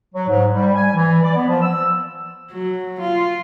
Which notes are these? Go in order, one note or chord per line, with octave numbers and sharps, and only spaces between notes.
F#3
G#2
G3
G#5
E3
D5
B3
F3
E6
F#3
F4